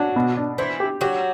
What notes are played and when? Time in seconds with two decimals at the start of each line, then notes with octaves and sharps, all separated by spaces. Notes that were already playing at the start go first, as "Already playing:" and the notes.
Already playing: F#3 D4 F#4
0.16 B2
0.37 D4
0.58 E3 E4 C5
0.80 G4
1.01 F#3 F#4 G4